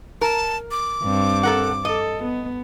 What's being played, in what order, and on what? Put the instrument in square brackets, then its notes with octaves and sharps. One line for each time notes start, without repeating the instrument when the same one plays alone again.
[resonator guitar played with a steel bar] A#4 [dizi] A5
[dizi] D6
[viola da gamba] G2 C4
[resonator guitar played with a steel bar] A4 A#4 F#5
[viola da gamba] A4 [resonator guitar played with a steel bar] D#5
[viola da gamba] B3